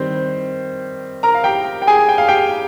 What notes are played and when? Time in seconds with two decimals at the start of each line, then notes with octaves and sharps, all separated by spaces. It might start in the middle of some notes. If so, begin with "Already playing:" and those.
Already playing: D#3 G3 C4 C5
1.23 A#4 A#5
1.34 F5
1.44 G4 G5
1.82 G5
1.87 G#4 G#5
2.09 G5
2.18 F5
2.28 G4 G5